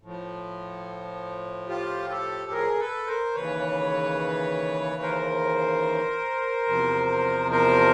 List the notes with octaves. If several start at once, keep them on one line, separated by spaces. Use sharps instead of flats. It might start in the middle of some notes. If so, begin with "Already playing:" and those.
A2 F3
F4 G4
G4 A4
G#4 A#4
A4 B4
A#4 C5
D#2 C#3 E3 B4 C#5
A#4 C5
E2 C3 F3
A#4 C5